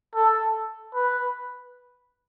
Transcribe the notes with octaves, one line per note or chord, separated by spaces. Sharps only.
A4
B4